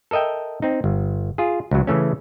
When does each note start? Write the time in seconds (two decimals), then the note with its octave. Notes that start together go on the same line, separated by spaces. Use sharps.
0.11 A4 A#4 D#5 E5 G5
0.62 C4 D#4
0.84 G1
1.38 F4 G#4
1.71 C#2 F#3
1.87 C#3 E3 A3 C#4